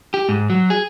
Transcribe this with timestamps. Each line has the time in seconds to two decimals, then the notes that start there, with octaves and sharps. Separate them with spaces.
0.14 G4
0.29 G#2
0.50 F#3
0.70 G#4